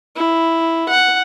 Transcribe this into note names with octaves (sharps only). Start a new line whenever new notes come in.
E4
F#5